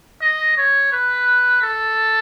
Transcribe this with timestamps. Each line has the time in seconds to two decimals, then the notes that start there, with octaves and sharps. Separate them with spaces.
0.22 D#5
0.57 C#5
0.92 B4
1.62 A4